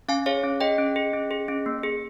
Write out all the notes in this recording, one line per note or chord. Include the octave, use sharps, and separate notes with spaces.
C#4 F5 G#5
G#4 C#5 F5
C#4
G#4 D#5 G5
C#4
G#4
C#4
G#4
C#4
A#3
G#4